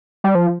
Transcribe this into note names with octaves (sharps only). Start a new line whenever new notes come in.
G3
F3